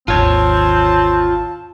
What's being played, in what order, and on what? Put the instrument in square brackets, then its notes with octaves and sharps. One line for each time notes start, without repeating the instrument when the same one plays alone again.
[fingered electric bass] G#1 D#2 [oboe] C4 [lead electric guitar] F4 C#5 [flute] A5